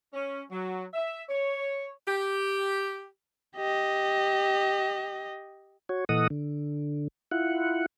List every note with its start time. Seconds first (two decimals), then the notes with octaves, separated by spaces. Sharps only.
0.14 C#4
0.50 F#3
0.94 E5
1.29 C#5
2.07 G4
3.56 G4 D#5
5.89 F#4 C#5
6.09 A#2 E3 A4 D#5 F#5 D#6
6.30 D3
7.31 E4 F4 F#5